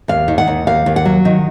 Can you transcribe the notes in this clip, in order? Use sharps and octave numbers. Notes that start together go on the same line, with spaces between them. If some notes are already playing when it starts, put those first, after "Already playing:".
D#2 F5
D#3
F#5
D#2
D#2 F5
D#2
F#5
F#3
D#3